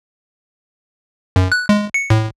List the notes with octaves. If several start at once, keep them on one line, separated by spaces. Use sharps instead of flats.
F#2
F#6
G#3
C#7
A2